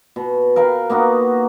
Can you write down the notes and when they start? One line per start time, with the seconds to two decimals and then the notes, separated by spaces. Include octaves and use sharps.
0.16 B2
0.56 A#4 B4 F5 G5
0.90 A#3 B3 D#4 F#4